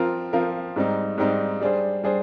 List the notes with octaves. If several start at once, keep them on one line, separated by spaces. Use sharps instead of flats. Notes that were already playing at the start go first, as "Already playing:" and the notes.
Already playing: F3 C4 F4 A#4
F3 C4 F4 A#4
G#2 G3 C4 D#4
G#2 G3 C4 D#4
G3 D4 G#4 C5
G3 D4 G#4 C5